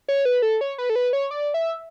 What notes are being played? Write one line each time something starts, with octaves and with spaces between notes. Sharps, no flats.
C#5
B4
A4
C#5
B4
A4
B4
C#5
D5
E5